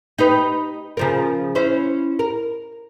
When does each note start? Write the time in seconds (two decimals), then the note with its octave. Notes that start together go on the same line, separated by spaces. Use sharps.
0.18 D#4 G4 B4
0.97 C#3 F3 A#4
1.55 C#4 E4 C5
2.19 A#4